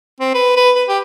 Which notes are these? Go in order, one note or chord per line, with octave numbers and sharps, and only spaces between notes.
C4
B4
B4
B4
G4